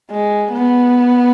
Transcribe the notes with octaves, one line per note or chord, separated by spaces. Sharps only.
G#3
B3